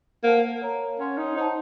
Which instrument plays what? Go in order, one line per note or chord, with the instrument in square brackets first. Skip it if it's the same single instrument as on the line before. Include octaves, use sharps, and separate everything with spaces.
[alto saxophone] A#3 [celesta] C5 F#5 A5
[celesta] A#4 C#5 F5 A#5
[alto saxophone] C#4 [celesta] C#5 F#5 C6
[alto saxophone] D#4
[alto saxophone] D#4 [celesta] C5 F#5 A5